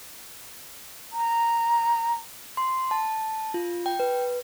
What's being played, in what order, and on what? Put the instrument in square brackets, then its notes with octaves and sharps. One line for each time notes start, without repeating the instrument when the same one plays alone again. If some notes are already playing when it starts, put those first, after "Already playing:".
[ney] A#5
[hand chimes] C6
A5
F4
G5
B4